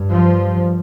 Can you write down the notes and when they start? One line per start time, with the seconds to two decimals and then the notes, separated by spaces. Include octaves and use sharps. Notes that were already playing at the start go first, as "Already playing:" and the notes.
Already playing: G2
0.11 F3